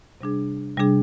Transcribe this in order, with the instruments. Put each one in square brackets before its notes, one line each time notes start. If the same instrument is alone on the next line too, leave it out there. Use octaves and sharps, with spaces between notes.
[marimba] C3 G3 D4 G#4
C3 G3 D4 G#4